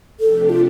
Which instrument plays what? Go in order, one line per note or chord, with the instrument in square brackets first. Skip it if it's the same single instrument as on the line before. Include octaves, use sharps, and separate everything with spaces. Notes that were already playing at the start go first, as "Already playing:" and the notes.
[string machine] C3 F3 A3 D4 G4 [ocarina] A4
[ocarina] F4